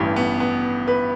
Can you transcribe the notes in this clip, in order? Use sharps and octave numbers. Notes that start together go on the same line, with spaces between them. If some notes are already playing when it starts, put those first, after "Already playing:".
Already playing: A1 G2 E3
B3
B3
B4